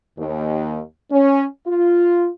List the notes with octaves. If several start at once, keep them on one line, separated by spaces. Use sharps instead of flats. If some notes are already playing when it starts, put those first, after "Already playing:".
D#2
C#4
F4